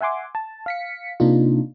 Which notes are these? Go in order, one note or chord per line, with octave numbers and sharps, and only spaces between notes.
E5 F#5 G#5 C6 D6
A5
F5 B6 C#7
C3 A#3 D4 D#4 F4